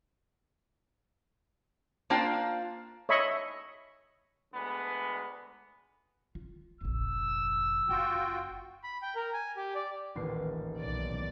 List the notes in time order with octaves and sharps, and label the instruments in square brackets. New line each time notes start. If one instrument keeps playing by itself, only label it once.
[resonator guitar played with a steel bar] A#3 D4 F4 C5 G5
[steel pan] C#5 D#5 E5 B5 C#6
[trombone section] D2 G#3 B3
[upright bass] F4
[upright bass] F1 A#1 [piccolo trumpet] E6
[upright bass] F#1 [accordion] F4 F#4 G5
[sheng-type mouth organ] B5
G5
A#4
G#5
G4
D5
[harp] D#1 A1 C7
[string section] B1 D5